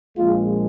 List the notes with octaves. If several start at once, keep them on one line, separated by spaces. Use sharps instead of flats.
A#1 A#2 F3 G#3 F4